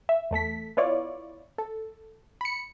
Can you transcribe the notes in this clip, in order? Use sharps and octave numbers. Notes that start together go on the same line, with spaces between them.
E5
E2 A3 A4 B6
B3 E4 F4 C#5 D5
A4
B5 C#7